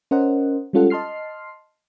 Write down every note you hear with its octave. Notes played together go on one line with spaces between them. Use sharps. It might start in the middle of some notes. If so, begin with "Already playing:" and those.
C#4 A#4 C5 D#5 F#5
G3 G#3 C#4 F4 A4 F#5
D#5 A5 C6 F6 C7